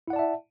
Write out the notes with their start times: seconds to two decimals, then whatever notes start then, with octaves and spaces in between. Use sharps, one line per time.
0.08 E4
0.10 F#5
0.13 D5
0.16 A5
0.19 E5